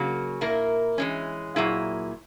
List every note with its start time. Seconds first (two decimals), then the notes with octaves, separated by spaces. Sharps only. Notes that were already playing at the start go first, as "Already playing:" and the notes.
Already playing: C#3 F#3 A#3
0.41 A#2 A#3 E4 A#4
0.98 E3 G#3 C#4
1.56 A#2 F#3 A#3 E4 G#4